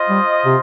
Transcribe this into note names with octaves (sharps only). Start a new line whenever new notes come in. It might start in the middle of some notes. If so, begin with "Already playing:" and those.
Already playing: F4 C5 D#5
G3
C3